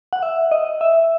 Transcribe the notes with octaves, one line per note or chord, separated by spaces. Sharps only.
F#5
E5
D#5
E5